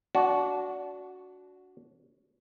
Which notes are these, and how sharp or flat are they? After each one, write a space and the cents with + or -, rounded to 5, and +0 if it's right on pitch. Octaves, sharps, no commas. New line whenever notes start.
D4 -25 F#4 +0